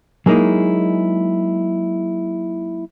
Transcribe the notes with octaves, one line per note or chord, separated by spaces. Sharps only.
F#3 G#3 A#3 D#4 E4 G#4